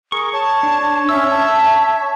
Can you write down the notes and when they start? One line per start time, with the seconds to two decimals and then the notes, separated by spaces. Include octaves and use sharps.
0.12 G#4 A#4 C#6
0.33 C#5 A5
0.63 D4
1.09 C#4 E5 E6
1.30 A5